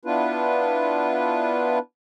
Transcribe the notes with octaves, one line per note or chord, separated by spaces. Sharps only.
B3 D4 E4 F4 B4